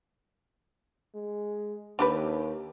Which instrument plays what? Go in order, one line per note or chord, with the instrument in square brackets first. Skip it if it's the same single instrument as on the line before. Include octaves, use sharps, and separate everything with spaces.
[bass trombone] G#3
[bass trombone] D#2 [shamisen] D4 G4 B4